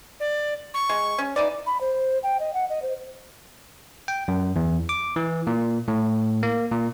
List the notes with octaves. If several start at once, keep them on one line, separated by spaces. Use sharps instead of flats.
D5
C#6
G#3
C#4
E3 D#4 D5
B5
C5
G5
D#5
F#5
D#5
C5
G5
F#2
E2
D6
E3
A#2
A2
A#3
A#2